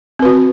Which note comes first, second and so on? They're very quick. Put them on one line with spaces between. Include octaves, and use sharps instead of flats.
C4 B4 F#4